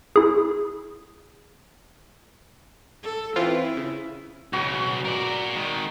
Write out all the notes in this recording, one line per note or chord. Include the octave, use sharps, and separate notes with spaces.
E4 G#4
A4
E3 C4 C#4 E4 F4
C#3
B1 C#3 F#4
A#4 D5
D#3 G#3